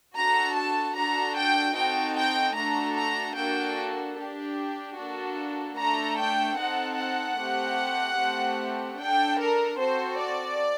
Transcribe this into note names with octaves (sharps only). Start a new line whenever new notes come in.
D4 F#4 A4 A#5
A5
D4 F#4 A4 A#5
G5
C4 D#4 F#4 A4 G5
G5
A3 D4 F#4 A4 A#5
A#5
A#3 D4 F#4 A4 G5
D4 G4
A#3 D4 F#4 A4
A3 D4 A4 A#5
G5
C4 D#4 A4 F#5
F#5
A3 C4 G4
A3 C4 G4
D4 A4 G5
A#4
C4 F#4 A4 C5
D5